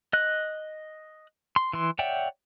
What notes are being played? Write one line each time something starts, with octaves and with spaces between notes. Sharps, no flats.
D#5 F#6
C6
E3 C6
C#5 D5 E5 F#5 G5